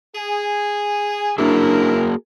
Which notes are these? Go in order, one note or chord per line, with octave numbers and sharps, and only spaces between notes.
G#4 G#5
A#3 D4 E4 F#4 G#4 A#4